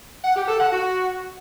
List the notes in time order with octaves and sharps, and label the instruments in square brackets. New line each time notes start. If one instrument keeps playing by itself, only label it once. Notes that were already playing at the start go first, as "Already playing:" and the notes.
[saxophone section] F#5
G4
A4
F#5
F#4